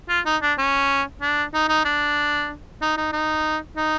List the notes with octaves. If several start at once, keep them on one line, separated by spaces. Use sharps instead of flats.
F4
D#4
D4
C#4
D4
D#4
D#4
D4
D#4
D#4
D#4
D#4